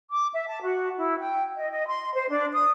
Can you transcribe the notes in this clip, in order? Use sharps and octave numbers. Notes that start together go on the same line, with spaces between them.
D6
E5
A5
F#4
E4
G5
D#5
D#5
C6
C5
D4
D#6